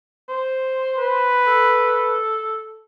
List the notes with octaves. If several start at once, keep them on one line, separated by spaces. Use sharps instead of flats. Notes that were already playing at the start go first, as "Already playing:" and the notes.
C5
B4
A4